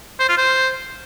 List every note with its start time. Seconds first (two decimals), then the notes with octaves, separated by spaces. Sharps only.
0.20 C5
0.29 F4
0.38 C5